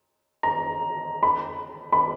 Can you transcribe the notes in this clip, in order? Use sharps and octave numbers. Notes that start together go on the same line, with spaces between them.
A#5
B5
B5